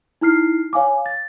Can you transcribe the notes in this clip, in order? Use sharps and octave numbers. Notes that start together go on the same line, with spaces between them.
D#4 E4 F6 C7
C#5 F5 G#5 D6
A6